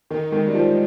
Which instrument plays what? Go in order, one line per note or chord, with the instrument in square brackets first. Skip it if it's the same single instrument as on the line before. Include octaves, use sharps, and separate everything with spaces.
[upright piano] D#3 [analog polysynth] D#4
[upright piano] D#3 [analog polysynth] G#3
[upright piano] G3
[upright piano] F3 [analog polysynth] D#4